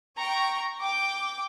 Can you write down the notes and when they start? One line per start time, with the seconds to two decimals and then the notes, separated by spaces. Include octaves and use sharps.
0.17 G5 A#5 C#6
0.81 G5 D6